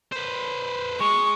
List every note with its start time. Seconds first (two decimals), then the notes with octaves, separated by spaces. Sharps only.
0.12 B4 C5
1.00 G#3 C#6